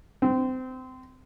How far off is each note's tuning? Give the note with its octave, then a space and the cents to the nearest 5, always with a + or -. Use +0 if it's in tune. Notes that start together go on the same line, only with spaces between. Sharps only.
C4 -25